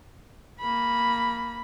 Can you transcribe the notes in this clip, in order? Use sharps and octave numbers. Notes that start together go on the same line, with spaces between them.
A#3 B5